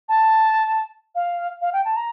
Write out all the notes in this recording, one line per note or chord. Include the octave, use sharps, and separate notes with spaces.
A5
F5
F5
G5
A5
A#5